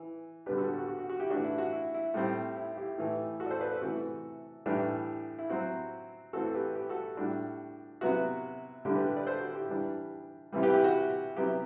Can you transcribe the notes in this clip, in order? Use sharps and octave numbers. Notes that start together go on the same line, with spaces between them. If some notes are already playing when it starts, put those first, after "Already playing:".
Already playing: E3
D3 G3 B3 D4 G4 B4
F#4 A4
F#4
F#4
F#4
F#4
F#4
E4 G4
E3 A3 D4 F#4
E4
F#4
E4
E4
A2 G3 C4
E4
E4 G4
A2 E3 A3
F#4 A4
D5
A4 C5
B4 D5
A4 C5
C3 E3 A3 F#4 A4
A2 E3 G3 D4
E4
F#3 C4 E4 F#4
E3 A3 C4 E4 F#4 A4
A4
G4 B4
G4 B4
F#4 A4
A2 G3 D4 F#4
C3 F#3 B3 E4 F#4
D3 G3 D4 E4 G4
G4 B4
G4 B4
B4 D5
A4 C5
F#4
E4 G4
E3 G3 D4
C3 E3 G3
G4 B4
E4 G4
F#4
C3 F#3 B3 E4 G4